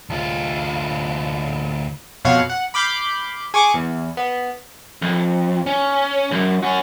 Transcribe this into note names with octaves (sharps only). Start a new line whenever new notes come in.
D2 F4
F2 B2 C#5 F5 F#5
F#5
B5 D6 F6 G6 C7
G#4 C#6 D6
E2
B3
F2
C#4
C2 F#2
C#4 F#4